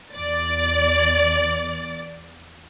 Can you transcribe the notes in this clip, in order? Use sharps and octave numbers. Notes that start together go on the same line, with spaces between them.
E2 D5 A6